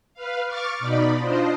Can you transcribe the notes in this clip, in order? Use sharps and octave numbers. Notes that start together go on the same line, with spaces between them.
B4 F5
C#6 D6 F6 A6
B2 D#4 D5 B5
D4 F4 C5 D#5